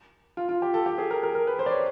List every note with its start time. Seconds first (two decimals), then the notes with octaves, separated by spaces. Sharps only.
0.37 F4
0.49 F4
0.62 G4
0.74 A4
0.86 G4
0.98 G#4
1.11 A#4
1.23 A#4
1.35 A#4
1.47 B4
1.59 C5
1.66 D5
1.71 C#5